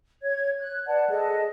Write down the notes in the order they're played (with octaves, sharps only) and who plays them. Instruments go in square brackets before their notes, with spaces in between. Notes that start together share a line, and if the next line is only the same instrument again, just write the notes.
[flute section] C#5 G#6
F#6
[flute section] B4 F#5 A5 [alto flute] D5
[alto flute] G#4 [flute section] A4 D#5 A5